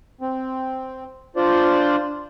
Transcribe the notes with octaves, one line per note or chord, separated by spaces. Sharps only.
C4
D4 F4 C5 D5